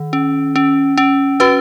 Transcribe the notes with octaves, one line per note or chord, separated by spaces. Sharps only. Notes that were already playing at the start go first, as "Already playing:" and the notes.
Already playing: D#3
C#4
C#4
C#4
C#4 F#4 B4